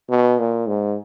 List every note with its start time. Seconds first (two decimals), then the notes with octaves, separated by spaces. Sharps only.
0.09 B2
0.39 A#2
0.67 G#2